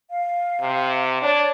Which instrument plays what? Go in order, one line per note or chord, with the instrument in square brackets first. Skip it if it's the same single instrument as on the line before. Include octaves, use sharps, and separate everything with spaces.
[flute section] F5
[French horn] C3
[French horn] D4 [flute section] C#5 D5